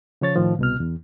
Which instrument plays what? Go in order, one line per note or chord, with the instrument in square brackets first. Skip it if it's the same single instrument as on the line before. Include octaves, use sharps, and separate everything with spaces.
[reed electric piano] C#3 F3 C#5 A6
A2 D#3 F3
C2 B2 F6
E2